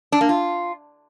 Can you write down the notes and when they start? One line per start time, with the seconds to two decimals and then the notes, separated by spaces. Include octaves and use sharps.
0.12 D4
0.21 A#3
0.29 F4